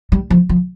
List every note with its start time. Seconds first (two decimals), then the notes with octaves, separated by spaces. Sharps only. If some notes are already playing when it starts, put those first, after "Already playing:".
0.12 G3
0.30 F3
0.49 F3